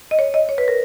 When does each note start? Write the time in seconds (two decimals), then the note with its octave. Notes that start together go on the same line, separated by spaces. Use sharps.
0.11 D#5
0.19 C#5
0.34 D#5
0.49 C#5
0.58 B4
0.68 A#4